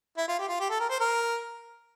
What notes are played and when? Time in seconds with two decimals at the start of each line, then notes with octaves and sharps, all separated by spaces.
0.18 E4
0.28 F4
0.39 G4
0.48 F4
0.60 G4
0.70 A4
0.80 A#4
0.90 C5
1.00 A#4